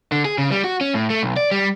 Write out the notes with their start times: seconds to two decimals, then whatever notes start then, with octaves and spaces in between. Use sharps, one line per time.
0.12 D3
0.25 G#4
0.38 C#3
0.51 G3
0.64 F#4
0.81 C#4
0.94 A2
1.10 A3
1.23 B1
1.37 D5
1.51 G3